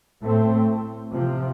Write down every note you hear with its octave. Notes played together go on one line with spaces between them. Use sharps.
A2 A3 C4
C3 F3 C4